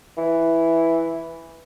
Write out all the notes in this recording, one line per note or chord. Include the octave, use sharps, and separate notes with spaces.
E3